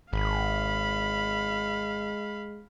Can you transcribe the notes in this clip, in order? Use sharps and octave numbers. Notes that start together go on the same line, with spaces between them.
G#1 G#3 F5 B5